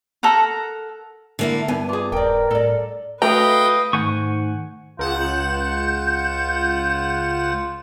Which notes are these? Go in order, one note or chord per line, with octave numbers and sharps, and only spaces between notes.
A4 A#4 F#5 A#5
D3 A#3 E4
G2 B3 G#5
F4 G#4 D6
D#1 A#4 D5 G5
A2 A4 D5
A3 F#4 B4 D#5 F5 G5 A#5 D#6
G#2 D#3 A3 F#5 G#5 C#6 G6
C#2 F4 F#5 G6 E7